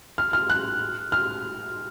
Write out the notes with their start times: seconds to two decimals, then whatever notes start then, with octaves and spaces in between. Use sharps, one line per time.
0.18 F6
0.33 F6
0.50 F#6
1.12 F6